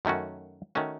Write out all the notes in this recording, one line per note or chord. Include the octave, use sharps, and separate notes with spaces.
F#2 D#3 A3 C#4 F#4
D#3 A3 C#4 F#4